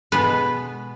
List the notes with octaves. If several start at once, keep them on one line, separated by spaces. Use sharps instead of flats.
B2 G#3 B3 B4